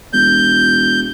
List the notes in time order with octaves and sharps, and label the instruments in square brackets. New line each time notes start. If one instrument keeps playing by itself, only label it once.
[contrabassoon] E1 [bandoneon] G6